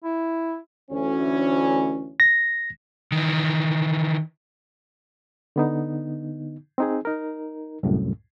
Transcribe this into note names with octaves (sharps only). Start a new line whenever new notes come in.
E4
D2 E3 C#4
A#6
D#3 E3
D3 B3 D#4
C4 D#4 G#4
D#4 A#4
C2 F#2 A2